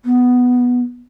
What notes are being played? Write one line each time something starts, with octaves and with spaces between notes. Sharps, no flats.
B3